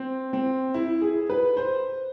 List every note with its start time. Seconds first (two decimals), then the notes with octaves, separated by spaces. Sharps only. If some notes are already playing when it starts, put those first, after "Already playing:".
Already playing: C4
0.33 C4
0.74 E4
1.02 G#4
1.30 B4
1.57 C5